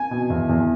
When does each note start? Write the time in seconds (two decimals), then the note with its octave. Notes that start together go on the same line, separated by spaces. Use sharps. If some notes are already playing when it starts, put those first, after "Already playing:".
Already playing: G#5
0.11 B2
0.30 E2
0.49 E2